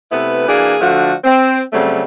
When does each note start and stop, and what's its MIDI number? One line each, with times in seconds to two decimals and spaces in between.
0.11 0.43 48
0.11 0.43 57
0.11 0.43 59
0.11 0.43 64
0.11 0.43 71
0.48 0.75 52
0.48 0.75 58
0.48 0.75 62
0.48 0.75 66
0.48 0.75 68
0.81 1.12 50
0.81 1.12 53
0.81 1.12 57
0.81 1.12 62
0.81 1.12 66
1.24 1.60 60
1.73 2.03 49
1.73 2.03 54
1.73 2.03 55
1.73 2.03 57
1.73 2.03 60